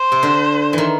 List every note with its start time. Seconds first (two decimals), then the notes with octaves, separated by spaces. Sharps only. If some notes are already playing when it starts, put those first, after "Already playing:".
Already playing: C5
0.12 C3
0.23 D3
0.73 D#3 E3